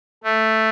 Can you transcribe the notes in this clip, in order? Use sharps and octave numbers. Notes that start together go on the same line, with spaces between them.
A3